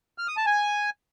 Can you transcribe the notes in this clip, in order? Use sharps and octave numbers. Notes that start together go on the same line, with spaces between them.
F6
D#6
A5
G#5